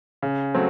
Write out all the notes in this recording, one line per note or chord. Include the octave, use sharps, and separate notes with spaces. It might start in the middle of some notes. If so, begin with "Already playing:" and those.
C#3
F#3 A3 C4